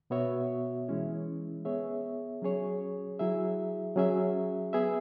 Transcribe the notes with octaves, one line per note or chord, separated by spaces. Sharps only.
B2 B3 F#4 C#5 E5
E3 G#3 C#4 E4
B3 G#4 C#5 E5
F#3 C#4 G#4 C#5
F#3 E4 G#4 E5
F#3 C#4 G#4 E5
B3 G#4 E5